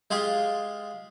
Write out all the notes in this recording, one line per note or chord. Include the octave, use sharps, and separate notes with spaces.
G#3 F4 G4 G#4